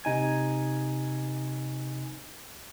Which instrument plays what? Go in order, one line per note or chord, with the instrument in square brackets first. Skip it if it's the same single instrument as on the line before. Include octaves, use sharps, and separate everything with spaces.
[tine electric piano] C3 D#4 G#5 G#6